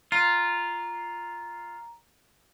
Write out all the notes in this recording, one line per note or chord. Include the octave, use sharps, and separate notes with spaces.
F4 A#5